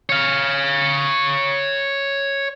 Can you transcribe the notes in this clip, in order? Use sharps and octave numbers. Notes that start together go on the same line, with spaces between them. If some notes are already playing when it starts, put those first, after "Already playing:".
C#5 F5